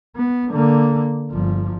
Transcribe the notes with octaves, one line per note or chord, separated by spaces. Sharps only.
B3
D3 A#3
G1 F3